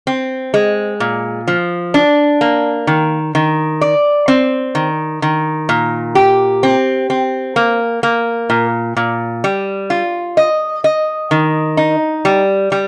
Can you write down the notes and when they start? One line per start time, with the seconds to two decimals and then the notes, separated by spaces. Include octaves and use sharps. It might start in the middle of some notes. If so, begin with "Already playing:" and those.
0.07 C4
0.54 G#3
1.00 A#2
1.48 F3
1.94 D4
2.41 A#3
2.87 D#3
3.35 D#3
3.81 D5
4.28 C4
4.75 D#3
5.22 D#3
5.69 A#2
6.15 G4
6.63 C4
7.10 C4
7.56 A#3
8.03 A#3
8.50 A#2
8.97 A#2
9.44 G3
9.90 F4
10.37 D#5
10.84 D#5
11.31 D#3
11.77 D#4
12.25 G3
12.72 G3